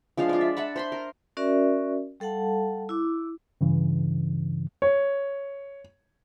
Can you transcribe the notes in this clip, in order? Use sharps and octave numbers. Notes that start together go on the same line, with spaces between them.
F3 G#3 D4 F5
F4 D5
E5
E5 F#5 A5 B5
C5 B5 C6
A#4
C#4 F#4 A#4 D5 E5
G3 A4 F5 F#5 A5
E4 D6
G2 C#3 E3
C#5